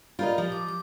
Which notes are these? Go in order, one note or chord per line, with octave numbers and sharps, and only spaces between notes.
F4 G4 A#4 D5 D#5 B5
F3 G4
D6
D6